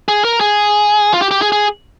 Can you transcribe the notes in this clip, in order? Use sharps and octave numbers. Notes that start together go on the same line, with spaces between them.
G#4
A#4
G#4
F4
G4
G4
G#4
G#4